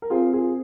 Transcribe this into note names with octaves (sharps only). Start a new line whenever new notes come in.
A#4
C4 F4 G#4
F4 G#4